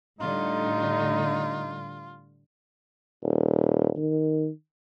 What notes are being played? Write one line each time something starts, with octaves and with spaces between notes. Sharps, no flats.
A2 D3 G3 D#4 F4
D#1
D#3